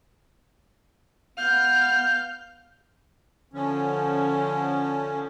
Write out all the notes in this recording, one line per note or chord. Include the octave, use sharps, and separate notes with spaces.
B3 F5 F6 G6
D3 F3 C#4